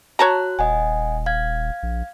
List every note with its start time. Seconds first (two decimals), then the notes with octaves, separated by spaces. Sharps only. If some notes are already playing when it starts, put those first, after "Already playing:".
0.19 F#4 C#5 A5 A#5 F#6
0.59 D#1 D#5 F#5 G#5
1.26 F5 G#6
1.83 A#1